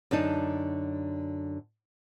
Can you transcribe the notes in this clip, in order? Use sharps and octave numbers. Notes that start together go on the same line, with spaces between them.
F#2 D3 D4 D#4